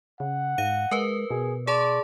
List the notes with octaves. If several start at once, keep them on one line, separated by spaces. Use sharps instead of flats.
C#3 F#5
G#2 F5 D#7
G#3 A#4 B4
B2 G#4
G#4 D5 A5 C6